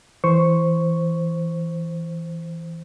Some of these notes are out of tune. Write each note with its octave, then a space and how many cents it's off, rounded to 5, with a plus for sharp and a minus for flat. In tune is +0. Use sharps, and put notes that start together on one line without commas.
E3 +0 C5 +0 C#6 +0